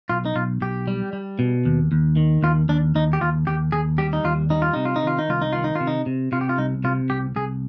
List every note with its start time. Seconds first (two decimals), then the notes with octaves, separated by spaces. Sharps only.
0.10 B1 F4
0.25 D#4
0.35 B1 F4
0.61 B1 G4
0.88 G3
1.13 G3
1.39 B2
1.65 D#2
1.92 D#2
2.17 D#3
2.43 D#2 F4
2.69 D#2 D4
2.95 D#2 D#4
3.13 G4
3.21 D#2 F4
3.47 D#2 G4
3.72 D#2 G#4
3.98 G3 G4
4.13 D#4
4.24 D#2 F4
4.50 G3 D#4
4.62 F4
4.73 C3 D#4
4.85 F4
4.96 D#4
5.03 D#3 F4
5.19 D#4
5.29 C2 F4
5.42 D#4
5.53 D#3 F4
5.64 D#4
5.75 F4
5.80 C3
5.87 D#4
6.06 C3
6.32 C3 F4
6.41 G4
6.49 F4
6.58 C2 D#4
6.84 C3 F4
7.10 C2 G4
7.36 C2 G#4